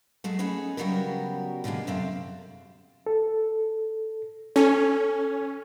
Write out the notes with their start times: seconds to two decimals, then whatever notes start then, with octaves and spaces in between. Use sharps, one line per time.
0.24 F#3 G#3 A3
0.39 B3 C#4 D#4 G#4 A4
0.77 C#3 F#3 G3 B3 F#4 A#4
1.64 B2 D3 G3 G#3 A#3
1.87 F#2 C3 C4 A4 F5
3.07 A4
4.56 C#4 A4